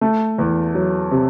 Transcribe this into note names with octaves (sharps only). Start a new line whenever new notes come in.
A3
E2
F#3
C3